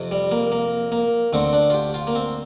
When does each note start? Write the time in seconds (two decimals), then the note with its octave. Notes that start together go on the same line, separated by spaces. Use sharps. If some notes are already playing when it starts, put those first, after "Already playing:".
Already playing: F2 C3
0.11 G3
0.31 A#3
0.52 A#3
0.92 A#3
1.33 D2 D3 C4
1.53 D4
1.70 F4
1.74 G4
1.94 F4
2.07 A#3
2.15 C4